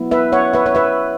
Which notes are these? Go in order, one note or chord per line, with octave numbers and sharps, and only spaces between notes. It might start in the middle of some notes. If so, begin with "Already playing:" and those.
Already playing: F#3 B3 E4
B4 E5
C#5 F#5
B4 E5
C#5
B4 E5